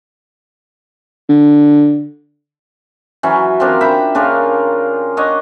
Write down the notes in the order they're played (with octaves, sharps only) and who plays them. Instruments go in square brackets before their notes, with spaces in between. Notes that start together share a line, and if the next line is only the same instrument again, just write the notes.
[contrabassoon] D3
[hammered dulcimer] E3 F#3 C#4
F3 C4 D4 A#4
E5 G5 A#5 B5
C#3 D4 F4 A#4
D4 C#5 D#5 F#5